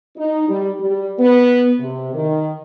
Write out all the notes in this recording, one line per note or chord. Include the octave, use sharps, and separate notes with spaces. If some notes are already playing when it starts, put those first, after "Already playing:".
D#4
G3
G3
B3
C3
D#3